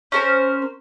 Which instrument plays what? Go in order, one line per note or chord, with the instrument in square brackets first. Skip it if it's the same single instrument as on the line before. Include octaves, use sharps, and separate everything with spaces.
[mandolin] C#4 A#4 C5